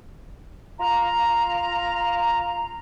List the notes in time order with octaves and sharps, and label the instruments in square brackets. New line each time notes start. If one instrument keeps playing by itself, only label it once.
[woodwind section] F4 F5 A#5